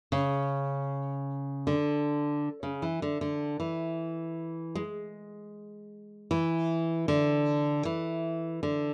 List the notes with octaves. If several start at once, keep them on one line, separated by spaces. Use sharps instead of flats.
C#3
D3
C#3
E3
D3
D3
E3
G#3
E3
D3
E3
D3